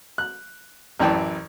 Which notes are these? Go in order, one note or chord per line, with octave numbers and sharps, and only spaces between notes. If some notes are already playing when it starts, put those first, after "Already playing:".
F#6
A1 F#2 E3 D5 G5 A5